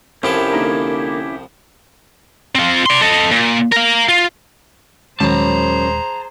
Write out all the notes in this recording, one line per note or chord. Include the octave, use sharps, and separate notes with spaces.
C2 F3 C#4 E4 G4 A4 A#4
D3 A#3 D#4
C4 F4
D5 C6
A4 D#5
A#2
A#4 F5
F4
D#1 F#2 D#3 G#3 G#4 C5 A5 A#5